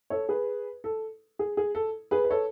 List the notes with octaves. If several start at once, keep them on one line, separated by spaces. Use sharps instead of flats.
A4 C#5
G#4 B4
A4
G#4
G#4
A4
G#4 B4
B4
A4 C#5